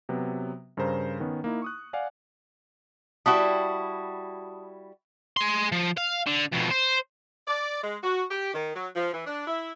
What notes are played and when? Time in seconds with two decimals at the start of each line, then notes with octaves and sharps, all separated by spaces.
0.09 C3 F#3 B3
0.77 G2 C#3 A#4 C5 A#5
1.20 D#3 B3 C#4
1.44 A#3 D#4 E4
1.62 C#6 D#6 F#6
1.93 D5 F5 F#5 G#5
3.26 G3 E4 F#4 A5 D#6
5.37 G#4 C6
5.72 F3
5.97 F5
6.27 D3
6.52 F2 B2
6.70 C5
7.47 D5
7.83 G#3
8.02 F#4
8.30 G4
8.54 D#3
8.75 F#3
8.95 F3
9.13 E3
9.27 D4
9.48 E4